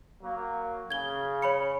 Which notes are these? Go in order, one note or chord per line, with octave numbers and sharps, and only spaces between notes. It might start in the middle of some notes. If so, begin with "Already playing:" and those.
F#3 A#3
C#3 G#6 G7
C#5 B5 C#7